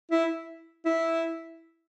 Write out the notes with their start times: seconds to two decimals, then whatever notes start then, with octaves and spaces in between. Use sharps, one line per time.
0.11 E4
0.85 E4